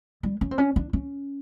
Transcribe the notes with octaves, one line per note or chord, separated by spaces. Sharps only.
G3
C#4
C4
C#4
D4
C#4